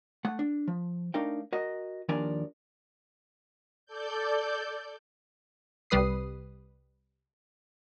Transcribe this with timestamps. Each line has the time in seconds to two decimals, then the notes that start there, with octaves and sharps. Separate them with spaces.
0.25 A3 F#5
0.39 D4
0.68 F3
1.14 A3 D4 D#4 A#4 F5 G5
1.53 F#4 A#4 D#5
2.09 D#2 F3 D4 A#4 D5 G#5
3.86 A4 D5 G6
5.90 C2 C3 G3 B4 D#6 C7